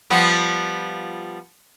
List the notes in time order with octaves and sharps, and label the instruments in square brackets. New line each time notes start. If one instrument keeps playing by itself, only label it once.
[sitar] F3 G3 B3